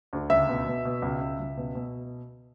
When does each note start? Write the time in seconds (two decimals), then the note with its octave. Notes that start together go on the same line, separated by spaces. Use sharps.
0.13 D2
0.30 C#2 E5
0.49 B2
0.67 B2
0.85 B2
1.02 C#2
1.21 C#2
1.40 C#2
1.57 B2
1.75 B2